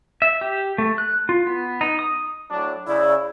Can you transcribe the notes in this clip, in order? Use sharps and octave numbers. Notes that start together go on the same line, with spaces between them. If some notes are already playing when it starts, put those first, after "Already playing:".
E5
G4
A3
F#6
F4
B3
D#4
D#6
A2 F#3 D4
C#3 E4 D5